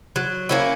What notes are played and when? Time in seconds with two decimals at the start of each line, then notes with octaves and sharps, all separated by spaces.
0.16 F#3
0.49 A#3 C#4 E4